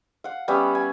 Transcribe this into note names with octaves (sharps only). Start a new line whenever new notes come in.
F5 F#5
G3 B3 C#4 E5
G#5